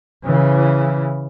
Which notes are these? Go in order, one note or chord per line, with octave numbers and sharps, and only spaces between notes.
C#3 E3